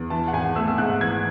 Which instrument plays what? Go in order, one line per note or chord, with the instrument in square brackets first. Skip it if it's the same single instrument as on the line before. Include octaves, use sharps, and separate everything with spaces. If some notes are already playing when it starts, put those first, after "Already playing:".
Already playing: [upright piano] E2
E3 A5
F#5
G#1 G#5
A3 E6
E6
G#2 F#6
E3 G#6